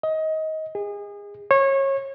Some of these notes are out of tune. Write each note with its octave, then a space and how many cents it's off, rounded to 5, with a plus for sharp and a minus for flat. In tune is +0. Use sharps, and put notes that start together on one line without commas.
D#5 +20
G#4 -30
C#5 -25